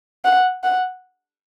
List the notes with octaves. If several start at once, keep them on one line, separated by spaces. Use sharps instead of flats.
F#5
F#5